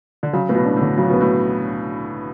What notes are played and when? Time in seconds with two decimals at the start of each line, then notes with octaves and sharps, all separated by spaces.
0.23 D3
0.33 C#3 F#3
0.49 A2 B3
0.54 B2
0.66 D4
0.76 A2
0.81 D3
0.97 C#3 F#3
1.09 B2 B3
1.21 A2